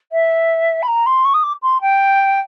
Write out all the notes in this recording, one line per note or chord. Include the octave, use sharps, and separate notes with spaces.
E5
B5
A#5
C6
C#6
D#6
D6
C6
G5